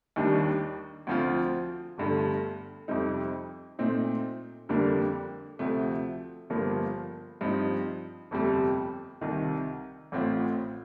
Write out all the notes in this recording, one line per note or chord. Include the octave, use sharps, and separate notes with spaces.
D#2 D#3 G3 D4
D2 D3 F3 C4 F4
G1 G2 D3 A3
F2 C3 G3 C4 D#4
A#2 A3 C4 D#4
F2 D3 G3 A#3 D4
D2 C3 F3 A3
G1 G2 F3 A#3
G2 F3 C4 D#4
G1 F2 C3 G3
C2 C3 D#3
A1 A2 A3 C4 F4